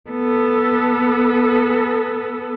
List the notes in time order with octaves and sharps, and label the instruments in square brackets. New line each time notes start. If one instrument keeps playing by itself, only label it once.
[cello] B3 A4